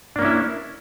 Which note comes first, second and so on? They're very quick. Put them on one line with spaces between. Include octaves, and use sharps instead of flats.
D4 A#3 C#4 E4